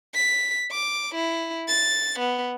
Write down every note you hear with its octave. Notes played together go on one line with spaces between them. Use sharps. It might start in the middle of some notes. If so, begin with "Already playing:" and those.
B6
D6
E4
A6
B3